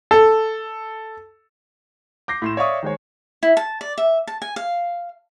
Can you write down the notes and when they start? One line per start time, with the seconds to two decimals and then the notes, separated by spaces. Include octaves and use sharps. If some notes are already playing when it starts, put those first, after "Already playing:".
0.11 A4
2.28 D6 G6 A#6 C7
2.42 A2 C6 E7
2.57 C#5 D5 E5 F5 C#6 D#6
2.83 D#3 G#3 C5 C#5
3.43 E4
3.57 A5
3.81 D5
3.98 E5
4.27 A5
4.42 G#5
4.56 F5